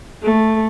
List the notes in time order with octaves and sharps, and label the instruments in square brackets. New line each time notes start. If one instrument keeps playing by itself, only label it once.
[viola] A3